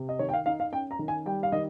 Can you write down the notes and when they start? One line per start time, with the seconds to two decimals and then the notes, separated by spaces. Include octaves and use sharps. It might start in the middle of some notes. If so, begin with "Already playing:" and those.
Already playing: C3
0.09 D#5
0.19 D#3 C#5
0.29 G5
0.33 F5
0.46 D#4 F5
0.60 F5
0.72 C#4 G5
0.91 A#5
0.99 D#3
1.08 G#5
1.26 G3 G5
1.43 F5
1.52 D#3 D#5